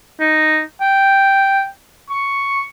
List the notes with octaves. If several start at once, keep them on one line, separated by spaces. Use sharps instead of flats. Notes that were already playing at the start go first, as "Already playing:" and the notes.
D#4
G5
C#6